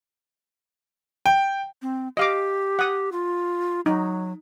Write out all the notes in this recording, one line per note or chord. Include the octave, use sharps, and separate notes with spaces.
G5
C4
G4 D#5 F5 D6
F#5 D#6
F4
F#3 D#4